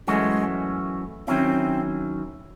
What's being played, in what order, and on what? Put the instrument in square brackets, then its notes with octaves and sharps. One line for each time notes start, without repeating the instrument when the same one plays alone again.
[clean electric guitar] F#2 E3 A3 C#4 F#4 [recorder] G#3
[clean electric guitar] D#3 F#3 C#4 E4 [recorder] C4